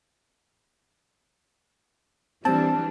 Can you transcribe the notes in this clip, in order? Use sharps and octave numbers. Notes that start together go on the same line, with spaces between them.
E3 G3 C4 D4 A5